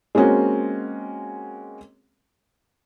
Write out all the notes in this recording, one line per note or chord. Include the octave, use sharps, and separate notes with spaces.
G#3 A#3 C4 C#4 F#4